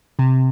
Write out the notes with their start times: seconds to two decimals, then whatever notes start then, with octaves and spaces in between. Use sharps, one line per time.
0.19 C3